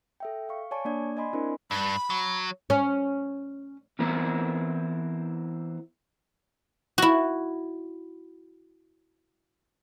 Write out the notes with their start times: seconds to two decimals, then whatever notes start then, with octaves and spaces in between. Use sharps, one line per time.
0.20 A4 E5 G5
0.49 F5 C#6
0.71 C#5 D5 G#5 A5 C#6
0.85 A#3 D4 D5 G#6
1.17 D5 D#5 G#5 B5 C6
1.33 C4 D4 E4 A#4 C5
1.71 G2 B5
2.10 F#3
2.70 C#4
3.99 E3 B3 C4 E4 A#4
6.98 E4 F#4